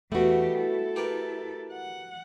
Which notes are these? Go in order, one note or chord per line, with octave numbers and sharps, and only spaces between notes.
E2 B2 G3 A3 F#4 G4
E4 A4
G4 A#4 B4
F#5